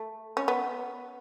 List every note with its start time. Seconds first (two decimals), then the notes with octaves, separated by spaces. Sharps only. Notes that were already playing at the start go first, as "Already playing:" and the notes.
Already playing: A3
0.37 C#4
0.48 B3